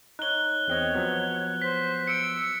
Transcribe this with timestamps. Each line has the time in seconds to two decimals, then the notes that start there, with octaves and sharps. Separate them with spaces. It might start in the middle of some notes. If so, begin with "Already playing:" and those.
0.19 D#4 C#5 F#6 G7
0.68 E2 C4 C#5 D#5
0.94 F3 F#3 B3
1.62 C5 B6
2.07 E6 C#7 D7